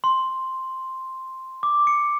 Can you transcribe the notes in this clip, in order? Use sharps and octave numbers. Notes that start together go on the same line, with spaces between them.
C6
D6
C#7